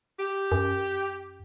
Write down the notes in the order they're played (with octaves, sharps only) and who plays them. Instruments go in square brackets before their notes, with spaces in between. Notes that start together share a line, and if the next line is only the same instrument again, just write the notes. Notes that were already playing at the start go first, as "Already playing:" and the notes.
[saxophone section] G4
[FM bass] F#2